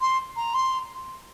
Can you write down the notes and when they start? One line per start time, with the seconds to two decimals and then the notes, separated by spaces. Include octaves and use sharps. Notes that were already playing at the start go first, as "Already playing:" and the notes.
0.01 C6
0.36 A#5
0.54 C6